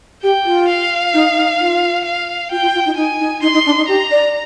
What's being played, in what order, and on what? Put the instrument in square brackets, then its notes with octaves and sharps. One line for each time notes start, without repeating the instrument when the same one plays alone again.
[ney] G4 [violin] G5
[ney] F4
[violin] F5
[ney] D#4
D#4
F4
[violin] F5
[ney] F4 [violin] G5
[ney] F4
F4
D#4
[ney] D#4 [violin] G#5
[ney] D#4
[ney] D#4 [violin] C6
[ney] D#4
D4
D#4
[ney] G4 [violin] A#5
[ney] D5